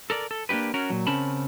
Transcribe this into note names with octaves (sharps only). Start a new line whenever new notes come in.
A4 A#4 D5
A4
A#3 D4 D#4 G4 B4
C#4 F#4 A#4
A#2 F#3
C#3 C4 C#4 A#4 A5 B5